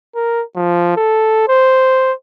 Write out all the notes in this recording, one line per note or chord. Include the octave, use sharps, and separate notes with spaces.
A#4
F3
A4
C5